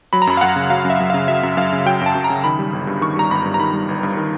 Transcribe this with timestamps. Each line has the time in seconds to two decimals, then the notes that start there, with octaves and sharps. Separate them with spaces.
0.13 F#3 B5
0.22 A#5
0.27 F#2 B5
0.37 F5
0.41 F#2 F#5
0.56 C#3
0.70 F#3 F5
0.85 F#2
0.90 E5
1.00 F#2
1.10 F5
1.14 C#3
1.28 F#3 E5
1.43 F#2
1.57 F#2 F5
1.72 C#3
1.86 F#3 G5
2.01 F#2
2.06 A5
2.15 F#2
2.24 A#5
2.30 C#3
2.44 D#3 B5
2.59 G3
2.73 G1
2.87 G2
3.01 D#3 C#6
3.16 G3 A#5
3.31 G1 B5
3.45 G2
3.54 A#5
3.60 D#3 B5
3.73 G3
3.88 G1
4.03 G2
4.17 D#3